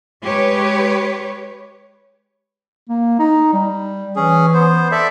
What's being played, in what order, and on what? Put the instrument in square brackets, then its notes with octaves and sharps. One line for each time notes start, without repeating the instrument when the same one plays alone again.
[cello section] G#3 G4 B4 C#5
[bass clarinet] A#3
D#4
G3
[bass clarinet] E3 [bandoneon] C#4 G#4
[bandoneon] B3 C5
A4 D5 E5